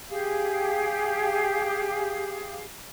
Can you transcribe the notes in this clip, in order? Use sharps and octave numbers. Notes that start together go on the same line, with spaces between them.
G4 G#4 F5